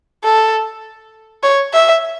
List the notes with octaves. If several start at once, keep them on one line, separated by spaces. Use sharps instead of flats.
A4
C#5
E5